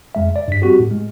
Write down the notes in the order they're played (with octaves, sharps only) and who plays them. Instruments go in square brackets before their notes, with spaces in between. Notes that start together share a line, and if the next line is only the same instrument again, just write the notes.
[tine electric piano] F2 G#3 E5
D5
G2 B6
G3 C4 F#4 G4
A2
G#3